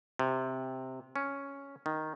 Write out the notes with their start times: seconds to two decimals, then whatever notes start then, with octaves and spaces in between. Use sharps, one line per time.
0.19 C3
1.16 C#4
1.86 D#3